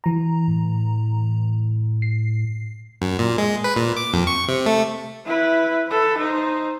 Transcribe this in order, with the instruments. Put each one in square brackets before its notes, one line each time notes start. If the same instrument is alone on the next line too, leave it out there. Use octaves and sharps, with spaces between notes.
[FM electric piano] E3 A#5
[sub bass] A2
[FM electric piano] C7
[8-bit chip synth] F#2
A#2
G#3
B4
A#2
D6
F2
C#6
C3
A3
[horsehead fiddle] E4 B4
A4 B4
D#4 C5